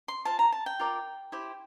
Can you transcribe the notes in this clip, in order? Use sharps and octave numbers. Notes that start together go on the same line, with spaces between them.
C6
F4 C5 A5
A#5
A5
G5
F4 A#4 D5
E4 G4 C5